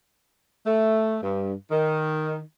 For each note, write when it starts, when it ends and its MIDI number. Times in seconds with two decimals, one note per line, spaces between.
0.65 1.16 57
1.22 1.52 43
1.71 2.40 51